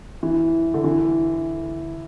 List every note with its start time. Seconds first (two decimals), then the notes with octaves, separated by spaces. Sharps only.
0.23 E3
0.74 D3
0.84 E3